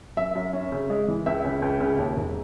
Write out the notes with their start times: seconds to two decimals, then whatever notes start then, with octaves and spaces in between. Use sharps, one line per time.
0.17 F#2 E5
0.35 F#2
0.53 C#4
0.72 C#3
0.90 G#3
1.08 E3
1.26 C#2 E5
1.44 C#3
1.62 C#2
1.80 C#3
1.98 D#2
2.17 E1